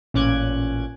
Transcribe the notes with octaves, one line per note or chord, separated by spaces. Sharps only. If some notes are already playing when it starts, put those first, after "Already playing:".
A1 A#2 C#4 D6 F#6 G#6